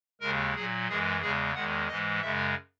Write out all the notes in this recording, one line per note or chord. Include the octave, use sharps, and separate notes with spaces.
D#2 C#3 G#3 A#4
A#2 F#3 G#4
F#2 E3 G#3 G#4
E2 C#3 G#3 G#4
E2 D#3 G#3 F#5
G#2 E3 G#3 D#5
F#2 C#3 G#3 E5